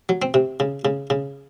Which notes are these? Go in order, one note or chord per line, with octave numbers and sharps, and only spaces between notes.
F#3
C4
C3
C#3
C#3
C#3